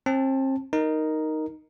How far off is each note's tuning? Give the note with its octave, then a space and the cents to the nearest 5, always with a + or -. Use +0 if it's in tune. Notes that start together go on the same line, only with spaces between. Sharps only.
C4 +35 A5 +0
D#4 +0 A#4 +0